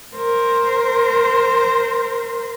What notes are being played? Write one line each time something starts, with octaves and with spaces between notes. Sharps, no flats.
A#4 C5